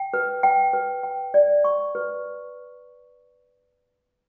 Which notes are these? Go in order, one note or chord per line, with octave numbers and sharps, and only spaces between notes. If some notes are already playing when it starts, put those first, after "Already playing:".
Already playing: G5
B4
G5
B4
G5
D5
C#6
B4